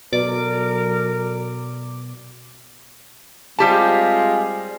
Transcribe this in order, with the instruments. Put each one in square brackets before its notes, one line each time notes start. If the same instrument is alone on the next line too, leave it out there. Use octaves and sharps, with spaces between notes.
[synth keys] B2 D5 D6 [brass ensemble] F#3 A4 A#4
[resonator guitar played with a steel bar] G3 G4 A5 [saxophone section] G#3 C4 F4